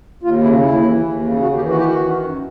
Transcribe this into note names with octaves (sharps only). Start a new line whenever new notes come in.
D#2 F4
C#3 E4
D#2 E4
E3
D#2
C#3
D#2 F#4
G4
E3
F#4
G4
D#3 F#4
D#3
F#2